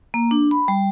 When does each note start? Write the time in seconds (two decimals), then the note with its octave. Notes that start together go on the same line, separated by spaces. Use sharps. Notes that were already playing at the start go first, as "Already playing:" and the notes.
0.14 A#3
0.31 D4
0.51 B5
0.68 G3